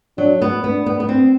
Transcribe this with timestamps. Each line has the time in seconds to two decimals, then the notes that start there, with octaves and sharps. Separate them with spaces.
0.18 F#3 D4
0.41 B3
0.63 B3 D4
0.86 B3
1.00 B3
1.09 C4